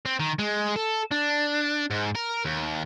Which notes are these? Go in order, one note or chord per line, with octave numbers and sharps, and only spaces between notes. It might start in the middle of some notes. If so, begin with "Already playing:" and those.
C4
D#3
G#3
A4
D4
G#2
A#4
D#2